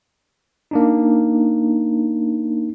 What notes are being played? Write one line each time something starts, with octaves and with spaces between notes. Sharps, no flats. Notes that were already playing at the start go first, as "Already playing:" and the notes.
A#3 D4 D#4